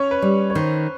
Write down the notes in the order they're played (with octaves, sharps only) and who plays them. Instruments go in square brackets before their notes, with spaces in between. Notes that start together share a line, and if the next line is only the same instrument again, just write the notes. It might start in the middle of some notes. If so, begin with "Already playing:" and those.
Already playing: [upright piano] C#4 C#5
B4
[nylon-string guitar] G3
[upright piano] C#5
[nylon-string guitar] D#3 [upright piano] C5